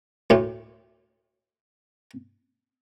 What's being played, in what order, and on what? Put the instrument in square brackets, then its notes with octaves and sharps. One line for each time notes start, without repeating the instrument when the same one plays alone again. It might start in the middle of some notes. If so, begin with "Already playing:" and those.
[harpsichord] D2 A2